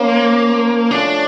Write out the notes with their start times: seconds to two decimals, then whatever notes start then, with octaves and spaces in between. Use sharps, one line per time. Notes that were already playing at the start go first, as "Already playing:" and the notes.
Already playing: F3 A#3 C#4 F4
0.91 F3 A3 C#4 D4